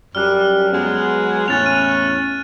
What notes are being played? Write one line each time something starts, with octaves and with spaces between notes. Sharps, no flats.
F#2 G3 F6 F#6
F#3 G#3 B3
E2 A2 C#4 F#6 A6 F7
F#6 D#7